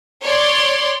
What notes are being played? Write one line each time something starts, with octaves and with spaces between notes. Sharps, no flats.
C#5 D5 C6